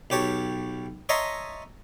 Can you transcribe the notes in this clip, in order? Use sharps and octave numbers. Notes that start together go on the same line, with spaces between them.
B1 G4 C#5 A5
C#5 D#5 E5 A5 A#5 C6